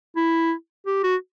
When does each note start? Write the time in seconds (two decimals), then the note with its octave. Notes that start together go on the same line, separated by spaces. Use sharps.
0.16 E4
0.86 G4
1.03 F#4